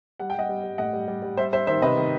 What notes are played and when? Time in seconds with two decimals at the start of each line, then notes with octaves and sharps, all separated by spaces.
0.20 G3 F#5
0.30 G5
0.35 G3 D#5 F#5
0.49 G3
0.64 G3
0.78 A2 D#5 F#5
0.93 G3
1.08 G3
1.22 G3
1.37 G3 C5 E5
1.53 G3 C5 E5
1.67 D#3 C5 E5
1.82 C3 B4 D#5
1.96 D#3